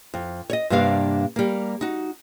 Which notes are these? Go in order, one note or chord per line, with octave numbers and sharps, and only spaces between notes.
F2
C#5 D#5
G2 C3 G3 A#3 D4 F5
G3 A#3
D#4 F#4